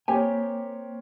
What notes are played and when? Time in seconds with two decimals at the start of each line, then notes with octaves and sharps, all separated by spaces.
0.08 A#3 C4 G4 A#4 C#5 G#5